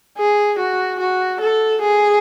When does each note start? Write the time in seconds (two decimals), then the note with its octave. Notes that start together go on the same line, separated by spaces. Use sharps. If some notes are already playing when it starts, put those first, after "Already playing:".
0.17 G#4
0.58 F#4
0.99 F#4
1.40 A4
1.81 G#4